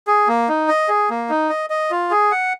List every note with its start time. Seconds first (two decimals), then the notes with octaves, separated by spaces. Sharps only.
0.07 G#4
0.28 A#3
0.49 D#4
0.68 D#5
0.88 G#4
1.10 A#3
1.30 D#4
1.50 D#5
1.70 D#5
1.91 F4
2.11 G#4
2.32 F#5